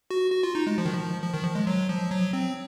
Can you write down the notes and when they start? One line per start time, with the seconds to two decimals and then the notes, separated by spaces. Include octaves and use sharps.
0.11 F#4
0.32 F#4
0.43 F4
0.55 D#4
0.67 G#3
0.78 F3
0.85 D#3
0.93 F3
1.22 F3
1.34 D#3
1.44 F3
1.55 G#3
1.67 F#3
1.89 F3
2.11 F#3
2.33 C4